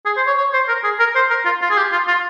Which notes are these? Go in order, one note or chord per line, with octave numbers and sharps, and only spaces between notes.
G#4
C5
C#5
C#5
C5
A#4
G#4
A#4
C5
A#4
F4
F4
G#4
G4
F4
F4